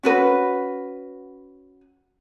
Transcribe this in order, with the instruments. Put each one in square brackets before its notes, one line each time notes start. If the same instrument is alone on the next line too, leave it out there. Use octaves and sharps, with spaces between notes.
[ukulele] C#4 F#4 B4